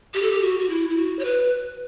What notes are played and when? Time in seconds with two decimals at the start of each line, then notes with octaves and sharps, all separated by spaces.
0.14 G4
0.22 A4
0.31 G4
0.42 F#4
0.60 F#4
0.69 E4
0.90 E4
0.97 F#4
1.19 C#5
1.25 B4